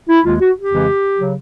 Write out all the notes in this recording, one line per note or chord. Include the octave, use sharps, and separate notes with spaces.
E4
D#2 D#3 G#3 F4
F#4
G4
F2 C#3 E3 G#3
C#3 F#3